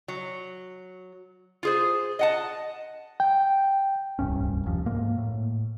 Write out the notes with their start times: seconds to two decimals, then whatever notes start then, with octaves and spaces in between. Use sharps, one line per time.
0.08 F#3
1.63 F4 G#4 C5
2.19 D#5 F#5 A5
3.20 G5
4.19 D1 C2 G2 C#4
4.65 F#1 D#2 F3
4.86 G#2 A#3
5.18 A2